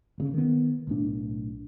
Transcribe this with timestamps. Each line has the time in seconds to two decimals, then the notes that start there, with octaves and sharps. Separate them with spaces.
0.18 G1 A#2 C#3
0.34 D#3 B3
0.87 B1 A2 D4